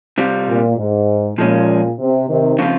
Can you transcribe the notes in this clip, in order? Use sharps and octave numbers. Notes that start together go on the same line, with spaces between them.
C3 G3 C4 F4
A#2
G#2
A#2 F3 G#3 C#4
C3
C3 D#3
C#3 F3 C4 F4